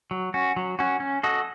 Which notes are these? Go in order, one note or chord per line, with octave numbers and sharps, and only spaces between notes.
F#3
C#4 F#4
F#3
C#4 F#4
C#4
F#4 A4 D#5